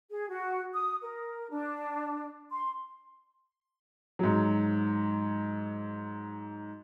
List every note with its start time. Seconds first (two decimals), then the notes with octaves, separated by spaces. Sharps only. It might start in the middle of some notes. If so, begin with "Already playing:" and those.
0.10 G#4
0.30 F#4
0.74 D#6
1.02 A#4
1.50 D4
2.51 C6
4.19 G#2 F#3